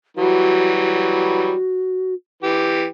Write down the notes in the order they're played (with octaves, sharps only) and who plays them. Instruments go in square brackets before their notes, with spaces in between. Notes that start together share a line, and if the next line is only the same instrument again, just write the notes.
[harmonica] E3 F#3 G3 [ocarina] F#4
[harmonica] E3 G4